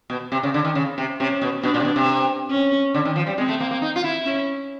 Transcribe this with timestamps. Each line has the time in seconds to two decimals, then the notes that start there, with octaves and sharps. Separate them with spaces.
0.10 B2
0.32 C3
0.43 C#3
0.54 D3
0.65 D#3
0.75 C#3
0.98 C3
1.20 C3 C#4
1.42 B2
1.63 B2 D4
1.74 A#2
1.80 C3
1.85 B2
1.96 C3
2.50 C#4
2.94 D3
3.05 D#3
3.16 F3
3.27 G3
3.38 G#3 C4
3.48 A3
3.60 A#3
3.71 A#3
3.82 D#4
3.96 F4
4.04 E4
4.25 C#4